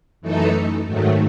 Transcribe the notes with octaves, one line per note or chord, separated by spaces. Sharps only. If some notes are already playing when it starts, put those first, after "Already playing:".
F#2 E3 A3 D#4 A4
G#2 D#3 F#3 A3